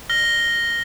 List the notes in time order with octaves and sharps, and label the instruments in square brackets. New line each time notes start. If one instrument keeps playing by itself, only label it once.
[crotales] F6 A#6 G7